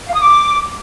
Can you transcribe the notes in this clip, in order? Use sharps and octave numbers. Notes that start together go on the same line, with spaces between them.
F5
D#6
D6